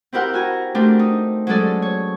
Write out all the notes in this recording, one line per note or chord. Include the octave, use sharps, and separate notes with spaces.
C4 E4 G4 A#4 F#5 G5
F#4 G#5 A#5
A3 C4 D4 G4 A#4
D#4
F#3 G#3 C#4 G#4 A4 D5
C#5